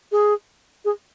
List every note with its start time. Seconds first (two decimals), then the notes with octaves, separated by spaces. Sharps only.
0.12 G#4
0.85 G#4